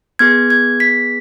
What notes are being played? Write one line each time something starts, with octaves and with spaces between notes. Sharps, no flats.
B3 G#4 G#6
G#6
B6